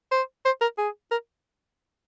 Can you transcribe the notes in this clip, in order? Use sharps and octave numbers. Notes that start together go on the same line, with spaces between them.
C5
C5
A#4
G#4
A#4